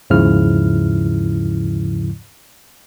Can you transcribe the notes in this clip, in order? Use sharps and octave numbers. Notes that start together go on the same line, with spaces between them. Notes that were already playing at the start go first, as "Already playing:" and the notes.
D#2 G#2 C#3 F3 E4 F6